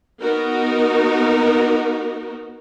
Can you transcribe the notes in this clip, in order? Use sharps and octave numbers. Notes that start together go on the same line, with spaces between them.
B3 D#4 F#4 A#4